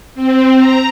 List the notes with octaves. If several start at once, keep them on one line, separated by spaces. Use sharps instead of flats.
C4
A#5